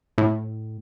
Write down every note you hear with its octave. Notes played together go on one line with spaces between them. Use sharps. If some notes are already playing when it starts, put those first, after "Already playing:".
A2